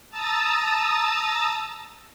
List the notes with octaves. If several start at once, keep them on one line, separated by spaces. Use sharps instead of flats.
A5 A#5 D#6 E6 A6